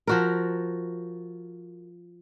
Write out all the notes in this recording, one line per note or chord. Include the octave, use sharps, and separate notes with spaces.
F3 F#4 A#4